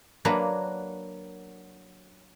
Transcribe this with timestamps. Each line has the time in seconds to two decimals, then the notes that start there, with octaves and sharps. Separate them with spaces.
0.25 F#3 A#3 D4 F#4 A#4 B4